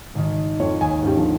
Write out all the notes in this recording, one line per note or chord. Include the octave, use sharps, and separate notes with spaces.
G#1 D#3
F2 F4 C#5
D#2 G#5
G#2 C#4 G4
D3 F3